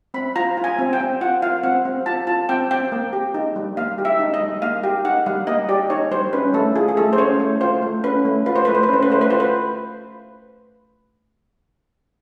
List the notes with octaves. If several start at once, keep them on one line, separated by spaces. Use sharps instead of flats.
C4 B5
F4 A#5
F4
G#5
C4
G5
C4
F4 F#5
F4 F5
C4 F#5
C4
F4 A5
F4 A5
C4 G5
C4 G5
A#3
G4
D#4
G3
A#3 F5
G4
E5
D#4
D#5
G3
A#3 F5
G4 F5
D#4 F#5
G3 F5
A#3 D#5
G4 D5
D#4 C#5
G3 C5
C#4 B4
A3 A4
F4 G#4
G#4
A3 A4
C5
C#4 C#5
A3
F4 C5
A3
C#4 B4
A3
F4 B4
C5
A3 B4
C5
B4
C#4 C5
B4
A3 C5
B4
F4 C5
B4